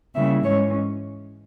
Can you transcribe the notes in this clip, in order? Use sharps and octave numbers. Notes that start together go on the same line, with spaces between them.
C#3 G3 A#3 E4 E5
G#2 E3 G#3 C#4 C#5